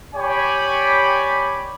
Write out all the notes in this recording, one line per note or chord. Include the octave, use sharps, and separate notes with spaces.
G4 C#5 D5 G5 G#5 B5